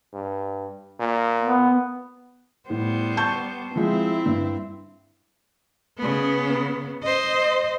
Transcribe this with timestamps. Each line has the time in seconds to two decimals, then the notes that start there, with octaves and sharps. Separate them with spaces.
0.13 G2
1.00 A#2
1.43 B3
2.70 A2 G3 B3 C5
3.17 A5 C#6 G6
3.76 F3 G#3 C4 E4
4.26 G2
5.98 C#3 B3
7.03 C5 D#5